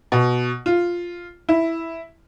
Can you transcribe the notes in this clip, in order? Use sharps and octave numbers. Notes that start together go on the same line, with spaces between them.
B2
F4
E4